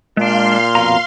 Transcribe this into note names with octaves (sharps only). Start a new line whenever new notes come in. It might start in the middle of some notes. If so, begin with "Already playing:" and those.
A#2 G#3 D4 F5 C6
F2 B2 A#5